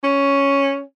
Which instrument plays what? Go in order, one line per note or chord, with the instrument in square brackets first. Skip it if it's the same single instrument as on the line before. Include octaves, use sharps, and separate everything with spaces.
[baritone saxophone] C#4